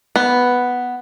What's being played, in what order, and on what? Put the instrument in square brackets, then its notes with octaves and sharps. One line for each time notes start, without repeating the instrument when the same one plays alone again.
[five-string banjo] B3